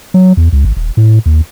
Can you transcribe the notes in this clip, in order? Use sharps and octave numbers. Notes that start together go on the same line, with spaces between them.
F#3
E2
C#2
G#1
D#1
A2
D#2